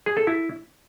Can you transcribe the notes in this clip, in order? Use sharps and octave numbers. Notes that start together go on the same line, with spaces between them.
G#4
A4
E4